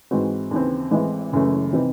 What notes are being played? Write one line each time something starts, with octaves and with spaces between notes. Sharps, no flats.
G#2 E3 G#3 C4 F#4
D#2 C#3 E3 C4
A1 A2 E3 G#3 C4
F#1 F#2 E3 A3 C#4
C3 E3 C4 D#4